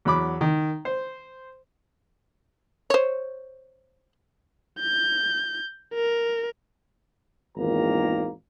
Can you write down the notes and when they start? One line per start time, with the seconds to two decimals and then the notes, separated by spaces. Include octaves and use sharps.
0.05 E2 F#3 B5 D6
0.41 D#3
0.85 C5
2.90 C5 C#5
4.80 G6
5.94 A#4
7.57 G#1 E2 A#2 D#3 A#3 A#5